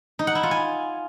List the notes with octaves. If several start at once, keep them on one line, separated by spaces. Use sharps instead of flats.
D#4
F#5
E4
F4
G#5